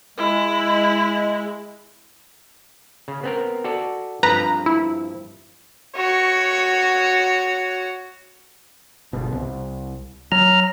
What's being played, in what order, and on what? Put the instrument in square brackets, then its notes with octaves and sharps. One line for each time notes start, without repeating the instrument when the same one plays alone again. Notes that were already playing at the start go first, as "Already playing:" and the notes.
[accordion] G#3 [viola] E4
[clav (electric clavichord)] C#3
B3 C4 A#4
F#4 A4 D5
[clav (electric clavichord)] G2 F3 C4 [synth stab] B4 A#5
[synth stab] E4
[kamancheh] F#4 C#5
[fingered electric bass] G1 B2
C2
[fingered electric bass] F#3 [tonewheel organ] A#5 F6